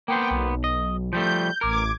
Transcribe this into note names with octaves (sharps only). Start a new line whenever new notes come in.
A#3 B3 C5 G5
B1
D#5
F3 G3 A3 G6
A1 A#4 D6 G#6